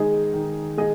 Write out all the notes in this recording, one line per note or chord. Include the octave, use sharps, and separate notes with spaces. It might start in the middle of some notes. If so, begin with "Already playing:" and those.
Already playing: D#3 G#3 D#4 G#4 D#5
D#3
G#3 D#4 G#4 D#5